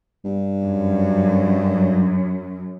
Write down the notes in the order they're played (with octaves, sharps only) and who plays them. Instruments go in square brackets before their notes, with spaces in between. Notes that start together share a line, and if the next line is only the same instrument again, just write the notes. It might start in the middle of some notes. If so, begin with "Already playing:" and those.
[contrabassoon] G2
[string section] F#2